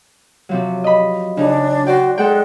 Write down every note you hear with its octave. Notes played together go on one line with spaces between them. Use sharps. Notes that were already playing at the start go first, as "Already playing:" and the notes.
C3 F3 F#3
D#5 B5
C#3 D4 D#4 G#4
F#4 C5 D5 G5
G#3 A4 F#5 G5